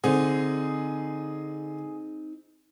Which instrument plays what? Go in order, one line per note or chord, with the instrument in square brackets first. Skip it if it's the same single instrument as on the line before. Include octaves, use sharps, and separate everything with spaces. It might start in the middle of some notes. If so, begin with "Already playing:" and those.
[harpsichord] D3 [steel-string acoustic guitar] C4 D#4 [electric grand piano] G#4